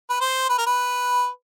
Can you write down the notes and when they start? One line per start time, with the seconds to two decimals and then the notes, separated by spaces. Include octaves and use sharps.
0.10 B4
0.21 C5
0.49 B4
0.58 A#4
0.67 B4